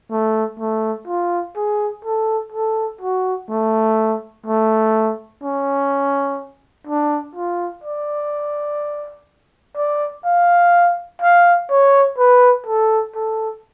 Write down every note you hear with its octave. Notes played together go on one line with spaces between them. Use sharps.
A3
A3
F4
G#4
A4
A4
F#4
A3
A3
C#4
D4
F4
D5
D5
F5
F5
C#5
B4
A4
A4